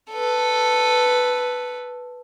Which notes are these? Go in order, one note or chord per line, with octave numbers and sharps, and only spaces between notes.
A4 B4